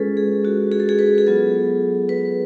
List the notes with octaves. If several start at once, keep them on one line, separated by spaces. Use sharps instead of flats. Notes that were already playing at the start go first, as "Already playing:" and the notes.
Already playing: G#3 C#4 F4 G#4 A4 B4
G#4
F#4
G#4
A4
G#4
B4
G#4
F#3 B3 F4 A4
B4